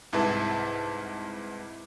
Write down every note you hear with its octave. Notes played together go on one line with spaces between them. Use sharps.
C2 G#2 E4 B4 A5